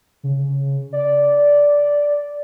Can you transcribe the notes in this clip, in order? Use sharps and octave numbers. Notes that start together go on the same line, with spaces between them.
C#3
D5